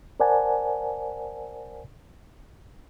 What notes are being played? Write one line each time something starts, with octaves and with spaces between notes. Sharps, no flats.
A#4 C5 D5 F#5 G#5 A5